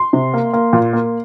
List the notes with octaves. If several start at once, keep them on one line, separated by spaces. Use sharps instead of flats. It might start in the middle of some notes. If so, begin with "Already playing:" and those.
Already playing: C6
C3
A#3
A#3
A#2
A#3